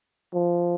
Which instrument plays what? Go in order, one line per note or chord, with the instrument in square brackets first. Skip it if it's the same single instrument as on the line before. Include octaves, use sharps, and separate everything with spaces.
[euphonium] F3